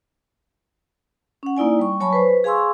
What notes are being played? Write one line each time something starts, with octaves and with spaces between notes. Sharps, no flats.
C#4 F#5
A#3 D#4 E4 D5 G#5
G3 C#6
F#3 C#5 G#5 A5 B5 C#6
B4 C5
G#4 F5 G#5 C6 C#6 E6